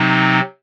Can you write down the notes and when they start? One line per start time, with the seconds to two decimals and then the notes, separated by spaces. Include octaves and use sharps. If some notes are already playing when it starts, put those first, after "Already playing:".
Already playing: C3 F#3 C4 D#4